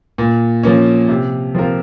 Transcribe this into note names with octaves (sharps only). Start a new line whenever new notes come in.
A#2
F3 A#3 C#4
C3
F3 C4 F4 A#4